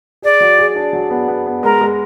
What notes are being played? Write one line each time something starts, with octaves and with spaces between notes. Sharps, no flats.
G#4 D5
F#3
G#4
D4
F#3
B3
B3
B3
G#3 A#4
G#3